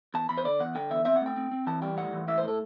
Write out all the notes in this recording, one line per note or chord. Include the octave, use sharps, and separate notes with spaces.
E2 A5
E2 B5
C5
D3 D5
E2 F#5
D3 G5
E2 E5
C4 E5
F#5
A3 G5
C4
C4
E3 A5
G3 G5
A2 F#5
E3
A2 E5
C5
A3 A4